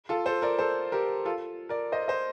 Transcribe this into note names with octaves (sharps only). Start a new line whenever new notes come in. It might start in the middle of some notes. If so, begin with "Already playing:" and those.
F4 A4
A4 C5
A#4 D5
A4 C5
G4 A#4
F4 A4
A#4 D5
C5 D#5
C5 D#5